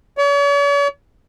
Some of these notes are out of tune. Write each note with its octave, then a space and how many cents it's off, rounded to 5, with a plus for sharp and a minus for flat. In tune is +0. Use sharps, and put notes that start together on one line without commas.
C#5 +45